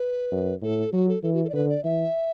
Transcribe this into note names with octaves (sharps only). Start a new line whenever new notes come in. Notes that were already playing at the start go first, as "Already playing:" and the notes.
Already playing: B4
F#2
A2 A4
F#3 F#4
A4
E3 A4
F#4
A4
D5
D3 B4
D5
E3 E5